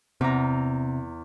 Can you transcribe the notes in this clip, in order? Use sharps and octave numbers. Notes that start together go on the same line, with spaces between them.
E2 C3 A#5